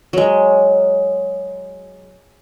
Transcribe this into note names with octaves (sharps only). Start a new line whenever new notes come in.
F#3 G#3